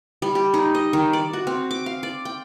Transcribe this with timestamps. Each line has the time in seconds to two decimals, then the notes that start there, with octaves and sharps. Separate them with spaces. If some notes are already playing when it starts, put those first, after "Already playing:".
0.22 G3
0.35 G4
0.54 D#4
0.75 D#5
0.93 D#3
1.13 D5
1.33 F#4
1.47 C4
1.71 D6
1.86 F5
2.03 D5
2.25 G5